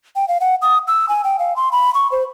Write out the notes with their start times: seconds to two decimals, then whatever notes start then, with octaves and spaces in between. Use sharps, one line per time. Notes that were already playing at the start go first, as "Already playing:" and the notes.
0.16 G5
0.28 F5
0.41 F#5
0.62 D#6
0.87 E6
1.09 G#5
1.24 G5
1.39 F5
1.56 C6
1.72 B5
1.94 C#6
2.12 C5